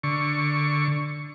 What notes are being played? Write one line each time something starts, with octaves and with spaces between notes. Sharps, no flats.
D3 C#6